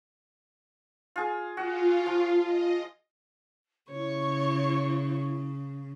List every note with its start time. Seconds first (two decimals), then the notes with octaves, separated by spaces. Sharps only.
1.16 F4 G#4
1.57 F4 F#4
2.06 F3
2.43 D#5
3.91 C#3 E4 C#5 C#6